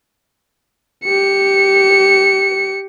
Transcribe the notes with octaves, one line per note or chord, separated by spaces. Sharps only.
G4 C#7